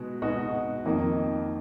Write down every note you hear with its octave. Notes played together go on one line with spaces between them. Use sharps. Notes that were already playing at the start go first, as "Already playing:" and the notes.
Already playing: B2 G#3 D#4 F#4
B2 G#3 D#4 F#4
F2 D#3 A#3 D#4